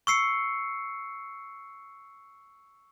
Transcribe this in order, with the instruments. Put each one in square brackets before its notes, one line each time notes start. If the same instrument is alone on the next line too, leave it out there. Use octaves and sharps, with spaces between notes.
[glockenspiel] C#6 E6 C7 C#7